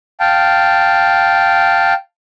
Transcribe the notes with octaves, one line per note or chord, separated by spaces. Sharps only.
F5 G5 A5